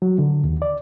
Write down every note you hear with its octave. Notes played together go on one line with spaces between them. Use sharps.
F#3
D3
D#2
D5